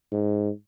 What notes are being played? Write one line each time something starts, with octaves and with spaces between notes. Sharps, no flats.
G#2